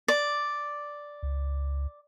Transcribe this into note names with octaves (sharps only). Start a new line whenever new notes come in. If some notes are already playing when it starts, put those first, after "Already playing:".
D5
C#2